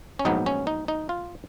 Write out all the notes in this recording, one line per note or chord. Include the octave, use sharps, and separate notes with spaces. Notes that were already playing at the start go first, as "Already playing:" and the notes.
C#4
A#1 G#2 F#3 B3 D#4
C#4
D#4
D#4
F4